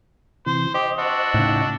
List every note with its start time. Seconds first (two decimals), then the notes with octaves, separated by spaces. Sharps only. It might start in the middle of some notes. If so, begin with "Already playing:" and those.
0.46 C3 E3 C5
0.74 G4 C5 D#5
0.98 D4 F#4 E6
1.34 A2 C#3 D#4 G5